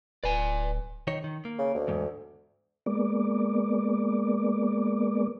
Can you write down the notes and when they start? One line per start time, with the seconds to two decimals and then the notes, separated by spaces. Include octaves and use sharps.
0.24 D1 B4 D5 G#5
1.07 D#3 D#4 C#5
1.24 D#3
1.45 A#3
1.59 C#3
1.75 D2
1.88 E2 G#2
2.86 G#3 A#3 B3 D5